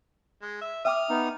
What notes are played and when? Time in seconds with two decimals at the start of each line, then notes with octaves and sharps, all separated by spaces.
0.42 G#3
0.61 E5
0.85 E5 G5 D6 D#6 F6
1.10 B3 D#4